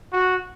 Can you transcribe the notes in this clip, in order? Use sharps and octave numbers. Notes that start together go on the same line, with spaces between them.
F#4